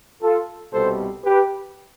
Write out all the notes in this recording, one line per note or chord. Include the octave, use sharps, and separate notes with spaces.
F4 A4
C2 B2 G3 A4 C5
G4 B4